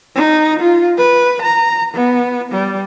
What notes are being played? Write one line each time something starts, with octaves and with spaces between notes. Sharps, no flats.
D#4
F4
B4
A#5
B3
G3